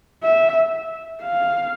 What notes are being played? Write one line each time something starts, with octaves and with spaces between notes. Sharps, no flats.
E5
F5